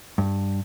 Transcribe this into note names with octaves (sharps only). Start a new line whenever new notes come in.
G2